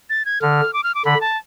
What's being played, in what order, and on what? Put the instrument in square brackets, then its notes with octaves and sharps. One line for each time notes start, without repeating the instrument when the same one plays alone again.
[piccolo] A6
G#6
[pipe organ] D3 [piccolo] F6
[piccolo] D6
F6
D6
[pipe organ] D3 [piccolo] B5
[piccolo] A5